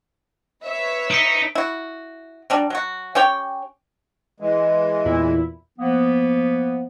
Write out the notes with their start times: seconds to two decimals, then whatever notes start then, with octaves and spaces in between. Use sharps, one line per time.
0.65 B4 C#5 E5
1.11 D#4 B6 C#7 D7
1.55 E4 F#4
2.50 F#3 G3 D4
2.70 F#3 F#4
3.15 C#4 G4 C#5 G5
4.40 E3 G#3
5.05 E2 A#2 E4
5.79 F3 A#3 B3